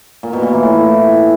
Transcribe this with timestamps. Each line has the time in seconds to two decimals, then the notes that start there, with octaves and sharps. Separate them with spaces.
0.23 A#2
0.33 B2
0.43 A#2
0.53 E3
0.63 A2